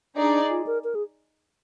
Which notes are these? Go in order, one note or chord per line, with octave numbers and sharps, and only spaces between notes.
D4 D#4 G#4 D5
F4
A#4
A#4
G#4